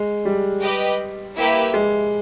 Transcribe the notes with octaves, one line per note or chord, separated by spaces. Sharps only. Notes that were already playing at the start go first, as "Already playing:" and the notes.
Already playing: G#3
G3
G4 B4 D#5
A#3 E4 G4 B4 E5
G#3